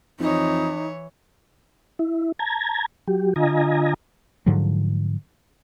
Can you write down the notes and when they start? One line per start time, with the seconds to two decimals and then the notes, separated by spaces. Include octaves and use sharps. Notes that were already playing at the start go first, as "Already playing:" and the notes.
0.20 F2 E3 D#4 C#5
1.99 E4
2.39 A5 A#5 G#6
3.08 F#3 G4
3.36 D3 F4 D#5 G#5 A#5
4.46 G#2 D3 F3 F#3